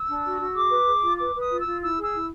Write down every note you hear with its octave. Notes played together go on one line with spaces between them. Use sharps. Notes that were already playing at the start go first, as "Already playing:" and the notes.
Already playing: E6
D4
F#4
F#4
G#4 D6
B4
G#4
F4
B4 D6
B4 D#6
F4
E6
F4
E4 E6
G#4 E6
E4